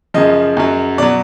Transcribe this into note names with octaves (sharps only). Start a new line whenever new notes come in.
F#2 C#3 F3 D#5
F#2 C#3 F#3
B2 F#3 D5